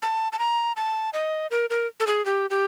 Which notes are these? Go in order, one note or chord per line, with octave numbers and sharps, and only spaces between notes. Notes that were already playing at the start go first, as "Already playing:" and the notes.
A5
A5
A#5
A5
D#5
A#4
A#4
A4
G#4
G4
G4